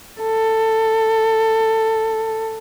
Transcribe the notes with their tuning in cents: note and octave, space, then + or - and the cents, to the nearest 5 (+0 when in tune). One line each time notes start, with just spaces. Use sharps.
A4 +15